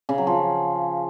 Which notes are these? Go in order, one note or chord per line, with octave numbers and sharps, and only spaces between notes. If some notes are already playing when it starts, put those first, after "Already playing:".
C#3
F#3
F3